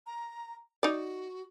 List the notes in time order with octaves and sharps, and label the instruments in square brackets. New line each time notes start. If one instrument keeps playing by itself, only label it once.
[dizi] A#5
[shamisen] D#4 D5 [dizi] F#4